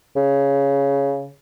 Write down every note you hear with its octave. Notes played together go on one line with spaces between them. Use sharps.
C#3